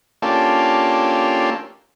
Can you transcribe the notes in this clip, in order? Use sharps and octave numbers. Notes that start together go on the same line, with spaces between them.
A#3 C#4 D4 F4 G4 A4